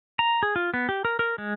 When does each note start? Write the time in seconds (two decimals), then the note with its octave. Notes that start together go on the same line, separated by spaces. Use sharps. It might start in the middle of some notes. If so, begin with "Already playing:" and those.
0.19 A#5
0.43 G#4
0.56 F4
0.74 B3
0.89 G4
1.05 A#4
1.19 A#4
1.38 G#3